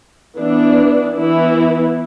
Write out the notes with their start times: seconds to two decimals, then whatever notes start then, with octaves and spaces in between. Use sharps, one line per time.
0.37 E3 B3 D4
1.16 E3 B3 E4